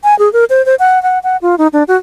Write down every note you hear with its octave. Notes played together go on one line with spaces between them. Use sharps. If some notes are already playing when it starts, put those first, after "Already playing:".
G#5
G#4
A#4
C5
C5
F#5
F#5
F#5
F4
D#4
D4
F#4